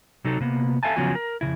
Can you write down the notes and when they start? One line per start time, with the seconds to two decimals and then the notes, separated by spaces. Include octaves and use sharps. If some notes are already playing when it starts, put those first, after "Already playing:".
0.25 C3 F#3 D#4 A4
0.40 C3 A#3 B3
0.83 A4 E5 F5 G#5 A5
0.96 C#3 F3 F#3 B3 F#4 G#5
1.15 A#4
1.41 F2 G#2 C#3 E4